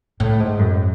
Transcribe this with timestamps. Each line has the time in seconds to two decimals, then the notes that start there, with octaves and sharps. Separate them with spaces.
0.20 A2
0.40 G#2
0.59 F#2